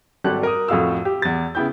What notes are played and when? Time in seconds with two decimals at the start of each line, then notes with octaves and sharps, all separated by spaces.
0.24 G#1 F#3 G3 G4 A4 F#6
0.43 A#4 D#6
0.68 F2 A2 F4 F#4 F5 E6
1.05 G4
1.22 E2 A6
1.55 C#3 B3 E4 G5 G6